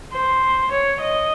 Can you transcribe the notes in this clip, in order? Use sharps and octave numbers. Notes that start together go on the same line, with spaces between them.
C5
C#5
D#5